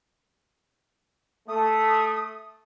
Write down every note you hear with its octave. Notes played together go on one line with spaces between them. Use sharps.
A3 D#6